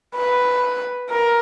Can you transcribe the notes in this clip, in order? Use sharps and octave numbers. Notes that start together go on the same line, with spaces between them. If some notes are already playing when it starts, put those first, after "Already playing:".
B4
A#4